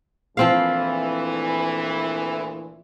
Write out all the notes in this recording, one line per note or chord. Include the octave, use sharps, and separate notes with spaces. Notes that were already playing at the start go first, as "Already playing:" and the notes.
D2 A#2 E3 F3 C4 F5